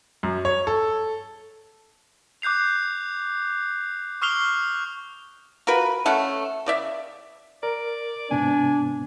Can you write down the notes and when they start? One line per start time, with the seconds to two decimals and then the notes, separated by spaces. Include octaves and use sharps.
0.23 F#2
0.45 C#5
0.67 A4
2.42 D6 F#6 G6 C7 F7
4.22 C#6 D#6 F6 C7 F7 G7
5.67 F4 F#4 A#4 B4
6.06 A3 C#4 A4 F#5
6.66 C#3 D5 E5
7.63 A#4 D5
8.31 G#2 C3 B3 D4 G#5